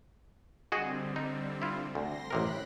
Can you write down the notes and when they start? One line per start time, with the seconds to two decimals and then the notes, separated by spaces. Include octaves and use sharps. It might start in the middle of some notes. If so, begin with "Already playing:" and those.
0.72 D3 G3 C4 F#4 G#4 D#5
1.16 D#4
1.62 E4 F4
1.95 D2 C6 A#6
2.30 A1 C3 A#4 B5 F#6